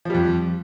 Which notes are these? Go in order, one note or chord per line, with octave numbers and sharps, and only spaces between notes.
F2 F3 G3